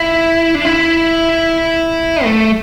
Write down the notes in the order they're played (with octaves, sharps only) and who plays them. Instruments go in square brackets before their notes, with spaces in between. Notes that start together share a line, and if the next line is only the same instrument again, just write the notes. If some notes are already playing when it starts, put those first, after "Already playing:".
Already playing: [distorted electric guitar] E4
D4
E4
A3